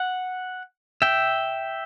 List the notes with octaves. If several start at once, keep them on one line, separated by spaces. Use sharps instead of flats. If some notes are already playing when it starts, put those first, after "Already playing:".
Already playing: F#5
E5 G5